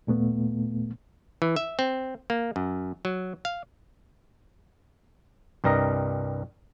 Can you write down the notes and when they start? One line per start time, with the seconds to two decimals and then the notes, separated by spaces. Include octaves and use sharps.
0.07 D#2 A#2 A3 B3
1.42 E3
1.56 E5
1.79 C4
2.30 A#3
2.56 F#2
3.05 F#3
3.45 F5
5.64 C2 G2 G3 A#4 D#5 A#5